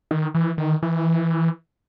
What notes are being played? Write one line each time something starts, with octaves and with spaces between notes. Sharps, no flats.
D#3
E3
D#3
E3